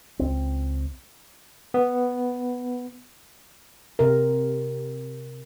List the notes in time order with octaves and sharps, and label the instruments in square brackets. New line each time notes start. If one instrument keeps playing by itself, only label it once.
[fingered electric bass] C#2 C4
[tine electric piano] B3
[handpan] C3 A#4